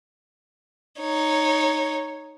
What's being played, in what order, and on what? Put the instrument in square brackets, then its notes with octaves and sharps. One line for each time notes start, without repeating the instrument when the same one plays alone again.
[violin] D#4 C#5